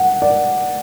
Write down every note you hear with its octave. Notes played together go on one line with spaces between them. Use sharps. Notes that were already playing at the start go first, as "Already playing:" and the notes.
Already playing: F#5
D5